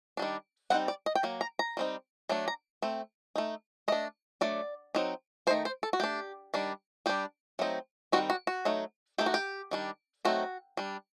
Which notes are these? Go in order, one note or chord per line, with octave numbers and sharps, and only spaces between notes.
D#3 G3 D4
G3 C4 D#4 F#5
D5
D#5
G5
F#3 A#3
A#5
A#5
G3 C4 D#4
F#3 A3 D4
A#5
A3 C4
A3 D#4
A3 D4 D#5
F#3 A3 D4 D5
F#3 C4 D#4
D#3 A3 D#4 C5
C5
A4
F#4
A3 D4 G4
D#3 G3 D4
G3 D4 G4
F#3 A3 C4 D#4
D#3 G3 C4 D#4 F#4
F#4
F#4
F#3 A3 D#4
D#3 A3 D#4 G4
F#4
G4
D#3 G3 D4
F#3 A3 C4 D#4 F#4
G3 D4